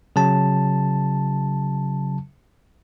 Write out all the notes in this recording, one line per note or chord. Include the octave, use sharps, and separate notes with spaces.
C#3 F#3 A5